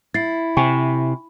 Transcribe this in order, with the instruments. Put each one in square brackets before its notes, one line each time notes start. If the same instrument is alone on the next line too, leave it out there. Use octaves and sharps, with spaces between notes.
[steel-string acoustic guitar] E4 [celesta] A6 C7
[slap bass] C3 [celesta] G5 G#5 C#6